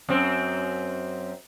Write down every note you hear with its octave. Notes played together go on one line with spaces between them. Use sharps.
F#2 C4